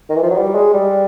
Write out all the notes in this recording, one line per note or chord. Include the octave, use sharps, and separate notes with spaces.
D#3
E3
F3
F#3
G3
G#3
G3